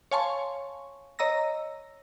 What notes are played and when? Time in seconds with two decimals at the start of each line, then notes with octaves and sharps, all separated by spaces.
0.11 C#5 F5 G#5 A5 C6 C#6
1.19 C#5 D#5 A#5 E6 A#6